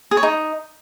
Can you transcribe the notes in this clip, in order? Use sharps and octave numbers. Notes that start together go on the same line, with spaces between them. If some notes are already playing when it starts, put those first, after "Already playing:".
G#4
C#5
D#4